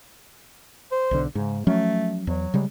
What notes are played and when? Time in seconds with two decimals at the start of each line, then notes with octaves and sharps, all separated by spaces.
0.91 C5
1.11 B1 D3
1.35 G#2 C#3
1.67 F3 F#3 A3 C#4
2.27 E2 F#3
2.54 C#3 G3 G#3